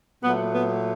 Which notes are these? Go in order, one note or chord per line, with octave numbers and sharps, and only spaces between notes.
A#2 F#3 A3 B3
B3